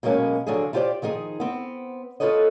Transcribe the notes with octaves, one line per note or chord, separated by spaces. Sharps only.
B2 F#3 G#3 A#3 C#4
D3 F3 F#3 D4 G#4
E4 F4 G4 A#4 C5 D5
D#3 F3 D#4 G#4
B3 C4
F4 F#4 A4 B4 C#5 D#5